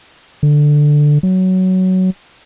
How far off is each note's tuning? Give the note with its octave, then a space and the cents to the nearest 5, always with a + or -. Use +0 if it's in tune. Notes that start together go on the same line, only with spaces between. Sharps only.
D3 +5
F#3 +10